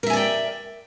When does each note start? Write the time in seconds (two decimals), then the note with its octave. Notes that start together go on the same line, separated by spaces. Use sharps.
0.03 A#4
0.07 E5
0.10 G#5
0.13 D5
0.17 G5